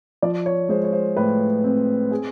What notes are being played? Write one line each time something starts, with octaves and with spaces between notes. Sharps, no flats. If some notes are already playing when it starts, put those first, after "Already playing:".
F3 D5
C#5
G#3 C5
C#5
C5
A2 B4
C4
G#4